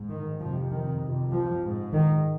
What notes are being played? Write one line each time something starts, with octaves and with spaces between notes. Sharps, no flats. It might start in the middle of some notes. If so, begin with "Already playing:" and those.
Already playing: G#2
D#3
F2 C3 F3
D#3
F2 C3
F3
G#2
D#3